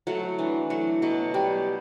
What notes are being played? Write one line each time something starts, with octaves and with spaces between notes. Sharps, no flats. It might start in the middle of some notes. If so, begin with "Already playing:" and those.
F#3 A3 F#4
E3 D4
F#3 A3 F#4
B2 F#3 F#4
F#3 G3 G4